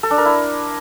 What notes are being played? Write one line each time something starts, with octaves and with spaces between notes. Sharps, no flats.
A4
D4
A#4
E4